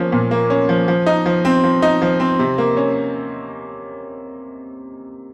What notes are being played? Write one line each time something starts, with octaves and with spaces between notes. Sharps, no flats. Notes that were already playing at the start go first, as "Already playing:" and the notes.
Already playing: F3 A#3 C#4
A#2
A#3
C#4
F3
F3
D#4
F3
C4
F3
D#4
F3
C4
C3
A#3
C#4